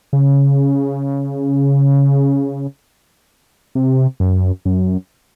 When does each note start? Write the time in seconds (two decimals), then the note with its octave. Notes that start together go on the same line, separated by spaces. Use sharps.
0.13 C#3
3.75 C3
4.20 F#2
4.65 F#2